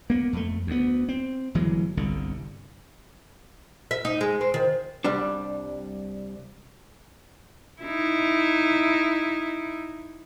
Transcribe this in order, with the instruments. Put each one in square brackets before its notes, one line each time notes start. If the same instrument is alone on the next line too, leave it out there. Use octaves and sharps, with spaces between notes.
[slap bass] A#3 B3
F2 A3
D2 B3
C4
G1 E3 F#3 G#3
G1 C2 D3
[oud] E5
D#4
G#3
C4
D#3
[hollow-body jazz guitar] C2 G3 D4
[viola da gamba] D#4 E4